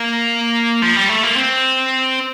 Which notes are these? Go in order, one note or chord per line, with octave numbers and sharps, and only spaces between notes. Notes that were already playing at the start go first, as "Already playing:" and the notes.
Already playing: A#3
F3
G3
A3
A#3
C4